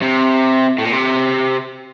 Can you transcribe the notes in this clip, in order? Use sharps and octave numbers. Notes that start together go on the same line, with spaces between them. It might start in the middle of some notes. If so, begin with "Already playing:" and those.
C3
A2
A#2
C3